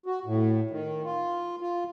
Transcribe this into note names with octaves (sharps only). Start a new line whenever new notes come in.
F#4
A2
D#3
F4
F4